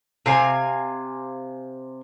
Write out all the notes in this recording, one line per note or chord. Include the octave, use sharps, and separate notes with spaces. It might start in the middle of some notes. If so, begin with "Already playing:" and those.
C3 F5 G#5